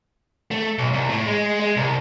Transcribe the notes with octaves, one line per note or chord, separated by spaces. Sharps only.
A3
B1
C2
A2
G#3
G#3
C2